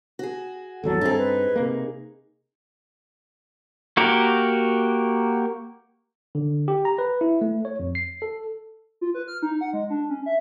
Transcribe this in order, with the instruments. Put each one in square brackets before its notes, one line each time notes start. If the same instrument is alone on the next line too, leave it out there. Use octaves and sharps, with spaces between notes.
[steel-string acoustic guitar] F#4 G#4
[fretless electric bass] G#1 E2 F#3 [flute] A4
[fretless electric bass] G2 C4 [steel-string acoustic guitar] D#4 G#4
[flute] B4
[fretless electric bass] C3 A#3
[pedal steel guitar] A#3 F#4 G4 A#4
[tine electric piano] D3
G4
A#5
B4
E4
A3
C#5
F2
C7
A4
[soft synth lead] F4
B4
F6
D#4
F#5
G#3
D4
C#4
E5